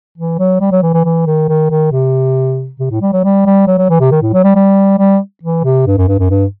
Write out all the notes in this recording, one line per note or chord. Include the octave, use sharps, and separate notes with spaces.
E3
F#3
G3
F#3
E3
E3
E3
D#3
D#3
D#3
C3
C3
A2
G3
F#3
G3
G3
F#3
F#3
E3
C3
D#3
A2
F#3
G3
G3
G3
E3
C3
G2
F#2
G2
F#2
G2